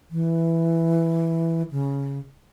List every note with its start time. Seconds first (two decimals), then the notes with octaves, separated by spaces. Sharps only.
0.11 E3
1.71 C#3